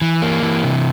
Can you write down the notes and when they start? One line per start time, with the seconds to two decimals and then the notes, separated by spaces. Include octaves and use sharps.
0.01 E3
0.22 A#3
0.43 E3
0.64 C3